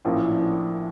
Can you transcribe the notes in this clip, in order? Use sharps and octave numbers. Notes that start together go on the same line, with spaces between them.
A#1 A2 F3 A#3 C#4